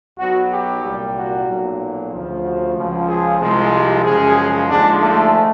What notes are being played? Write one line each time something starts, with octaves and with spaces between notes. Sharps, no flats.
B1 B2 F#3 F#4
G4
C2 A#2 G3
F#4
B1 A#2 F#3
D2 C#3 F3
F#4
C#2 C#3 F3
G#4
C2 C3 F3 G#3
G4
F#2 C#3 F3 G#3 G#4
D#2 D3 F3 G#3 D4
A3